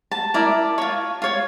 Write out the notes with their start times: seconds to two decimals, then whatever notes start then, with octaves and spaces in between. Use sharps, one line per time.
0.11 A5
0.34 E4 A#4 D5
0.78 F4 C#5 C#6
1.22 F4 C#5